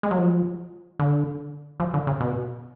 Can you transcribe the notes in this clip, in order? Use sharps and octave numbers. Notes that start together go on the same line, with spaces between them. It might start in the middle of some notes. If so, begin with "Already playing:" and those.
G#3
F#3
F3
D3
F3
D3
C#3
B2